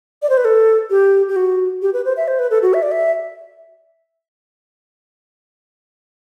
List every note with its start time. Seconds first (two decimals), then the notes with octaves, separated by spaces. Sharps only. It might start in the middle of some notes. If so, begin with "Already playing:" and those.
0.22 D5
0.30 C5
0.37 B4
0.45 A4
0.90 G4
1.28 G4
1.36 F#4
1.82 G4
1.93 B4
2.05 C5
2.17 E5
2.28 C5
2.39 B4
2.51 A4
2.62 F#4
2.74 E5
2.83 D5
2.92 E5